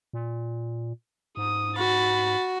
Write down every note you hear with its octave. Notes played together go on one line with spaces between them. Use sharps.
A#2
G#2 D#6
F#4 B5 A6